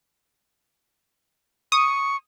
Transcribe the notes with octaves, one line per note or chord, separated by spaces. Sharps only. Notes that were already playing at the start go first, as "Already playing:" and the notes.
C#6 D#6